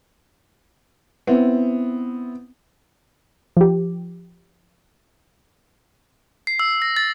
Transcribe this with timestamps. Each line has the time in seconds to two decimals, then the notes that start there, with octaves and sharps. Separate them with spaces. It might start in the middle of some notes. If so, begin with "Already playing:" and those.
1.27 B3 C4 E4
3.57 F3 G4
6.47 C7
6.59 E6
6.82 A#6
6.96 A6